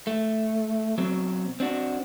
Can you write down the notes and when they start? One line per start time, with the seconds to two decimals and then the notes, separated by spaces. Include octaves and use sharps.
0.07 A3
0.98 B2 F#3 C4
1.60 C4 D4 F#4